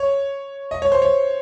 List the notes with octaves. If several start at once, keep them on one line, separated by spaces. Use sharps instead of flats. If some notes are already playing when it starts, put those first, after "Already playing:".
Already playing: C#5
D#5
C#5
C5
C#5